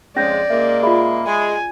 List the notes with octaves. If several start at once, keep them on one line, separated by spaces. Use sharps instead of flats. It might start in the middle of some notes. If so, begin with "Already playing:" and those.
F2 F3 G#3 C#4 C#5 D5 G6 A#6
A#2 G#3 A#3 E5
F4 G#4 E5 B5
G#3 G#5